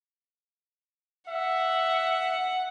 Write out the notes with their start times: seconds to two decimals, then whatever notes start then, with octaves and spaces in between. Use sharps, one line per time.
1.29 E5 F#5